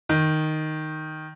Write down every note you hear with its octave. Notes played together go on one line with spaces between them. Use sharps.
D#3